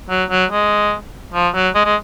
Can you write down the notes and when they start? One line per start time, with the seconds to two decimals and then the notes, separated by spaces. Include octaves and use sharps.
0.09 F#3
0.30 F#3
0.50 G#3
1.34 F3
1.54 F#3
1.75 G#3
1.85 G#3